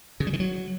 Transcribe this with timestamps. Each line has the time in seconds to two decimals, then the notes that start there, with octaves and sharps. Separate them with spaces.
0.20 C#3
0.27 G3
0.33 D#3
0.40 F#3